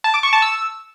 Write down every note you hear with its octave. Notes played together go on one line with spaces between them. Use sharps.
A5
D6
C#6
A5
E6